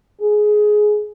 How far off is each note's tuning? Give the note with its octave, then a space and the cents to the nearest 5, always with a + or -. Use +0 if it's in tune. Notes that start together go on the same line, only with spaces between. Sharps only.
G#4 +15